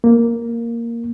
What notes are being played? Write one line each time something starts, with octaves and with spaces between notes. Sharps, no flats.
A#3